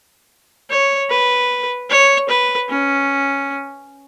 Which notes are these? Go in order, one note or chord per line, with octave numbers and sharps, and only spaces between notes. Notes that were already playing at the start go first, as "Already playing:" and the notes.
C#5
B4
C#5
B4
C#4